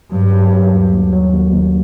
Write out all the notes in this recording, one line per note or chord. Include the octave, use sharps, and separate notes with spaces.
G2 F#3
F#3
F#3
D#2
D#2
F#3
D#2
D#2